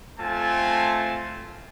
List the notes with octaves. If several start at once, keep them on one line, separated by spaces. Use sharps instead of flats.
A3 C4 F4 G#5 A5